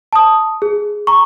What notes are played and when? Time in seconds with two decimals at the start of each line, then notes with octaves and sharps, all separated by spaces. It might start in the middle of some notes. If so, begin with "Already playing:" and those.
0.13 A5 D#6
0.62 G#4
1.07 A#5 C#6